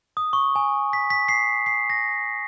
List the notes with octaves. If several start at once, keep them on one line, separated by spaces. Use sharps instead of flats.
D#6
C#6
G#5
B6
B6
C7
C7
A#6